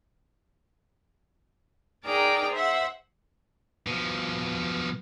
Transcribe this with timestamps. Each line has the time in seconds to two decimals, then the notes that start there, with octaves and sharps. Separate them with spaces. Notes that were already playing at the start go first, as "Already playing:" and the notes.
2.05 D#4 G#4 A#4 D5 G5 A#5
2.52 C5 E5 F#5
3.87 B2 F3